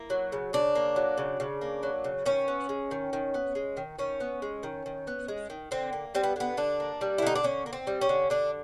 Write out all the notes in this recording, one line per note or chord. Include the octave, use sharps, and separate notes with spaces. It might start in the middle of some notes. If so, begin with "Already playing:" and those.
Already playing: A#3 E4
F#3
C#3
C#3 D4
A#3
F#3
C#3
C#3
A#3
F#3
C#3
D#3 C#4
B3
G#3
D#3
D#3
B3
G#3
D#3
D#3 C#4
B3
G#3
D#3
D#3
B3
G#3
D#3
D3 C4
A#3
G3 C4
B3
D3 B3
D3 D4
A#3
G3
E4
D3 D#4
D4
D3 C#4
A#3
C4
G3
C#4
D3
D3 D4